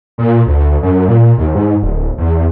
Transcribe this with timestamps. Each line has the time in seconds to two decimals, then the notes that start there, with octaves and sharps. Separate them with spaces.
0.18 A#2
0.46 D2
0.82 F#2
1.08 A#2
1.38 D#2
1.55 G#2
1.82 D1
2.18 E2